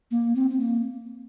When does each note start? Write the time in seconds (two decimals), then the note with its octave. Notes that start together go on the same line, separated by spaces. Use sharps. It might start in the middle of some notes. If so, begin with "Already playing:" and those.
0.11 A#3
0.36 C4
0.50 C4
0.60 A#3